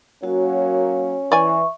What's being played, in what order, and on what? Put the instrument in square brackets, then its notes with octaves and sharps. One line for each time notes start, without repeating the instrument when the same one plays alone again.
[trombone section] F#3 A#3 [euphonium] C#4 [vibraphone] F#4
[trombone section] E3 [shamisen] D5 G#5 [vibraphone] E5 C#6